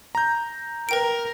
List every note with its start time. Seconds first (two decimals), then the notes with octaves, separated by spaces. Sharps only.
0.15 A#5 G6
0.89 A#4 B4 G5 D7